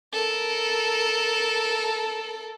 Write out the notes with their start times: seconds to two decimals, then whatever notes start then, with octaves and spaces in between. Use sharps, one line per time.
0.13 A4 A#4